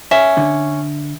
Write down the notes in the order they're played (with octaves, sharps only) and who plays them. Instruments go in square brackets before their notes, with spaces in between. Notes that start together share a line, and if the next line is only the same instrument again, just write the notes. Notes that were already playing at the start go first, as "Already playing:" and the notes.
[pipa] C#4 [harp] E5
[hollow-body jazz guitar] D3